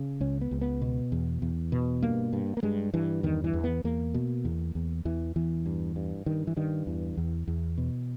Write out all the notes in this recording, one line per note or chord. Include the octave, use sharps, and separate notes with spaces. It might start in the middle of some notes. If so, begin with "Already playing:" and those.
Already playing: C#3
C#2 C#4
B3
C#2
B3
B2
E2
E2
B2
G2 A#3
G2
A#3
G2 G#3
G2 E3
E2 D#3
E3
E2
B3
E2 A#3
B2
E2
E2
E2 E3
E2 E3
G2
G2
G2 D#3
E3
G2 D#3
E2 E3
E2
E2
B2